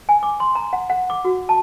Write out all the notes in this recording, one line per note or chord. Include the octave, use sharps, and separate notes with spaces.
G#5
D6
C6
A#5
F#5
F#5
D6
F#4
A5